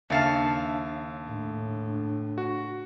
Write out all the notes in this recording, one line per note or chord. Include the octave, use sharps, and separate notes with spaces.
D#2 C#3 D4 E5 F5 A5 A6
A2 D4
F#4